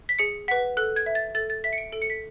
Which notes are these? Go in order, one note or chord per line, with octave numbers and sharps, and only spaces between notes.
B6
G#4 C#7
B4 F#5 B6
A4 F#6
G#6
E5
A6
A4 A6
A6
E5 B6
C#7
D7
A4 D7
C#7
B6